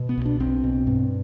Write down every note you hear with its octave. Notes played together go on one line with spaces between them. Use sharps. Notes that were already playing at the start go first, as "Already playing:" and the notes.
Already playing: B2
B3
B1
D4
B1 C4
B2
G2